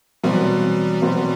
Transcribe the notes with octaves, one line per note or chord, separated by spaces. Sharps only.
B2 E3 F#3 G3 C4
B2 F#3 C4